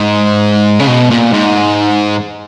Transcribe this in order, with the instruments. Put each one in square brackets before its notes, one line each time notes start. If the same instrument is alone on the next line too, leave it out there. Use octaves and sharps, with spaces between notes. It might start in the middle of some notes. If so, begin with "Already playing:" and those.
Already playing: [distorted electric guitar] G#2
C#3
B2
A#2
G#2